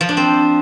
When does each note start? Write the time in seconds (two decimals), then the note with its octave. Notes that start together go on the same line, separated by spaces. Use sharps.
0.01 F3
0.09 D4
0.17 C4